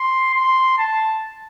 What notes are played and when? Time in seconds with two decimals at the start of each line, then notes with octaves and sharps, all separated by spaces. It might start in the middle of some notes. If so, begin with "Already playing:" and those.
Already playing: C6
0.34 C6
0.78 A5